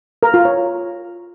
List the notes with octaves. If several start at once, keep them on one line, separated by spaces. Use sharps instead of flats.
A#4
F4
C#5